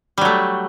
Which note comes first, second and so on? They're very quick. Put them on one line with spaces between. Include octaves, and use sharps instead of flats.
G3 F#3 A3